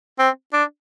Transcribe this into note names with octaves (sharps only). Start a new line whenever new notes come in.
C4
D4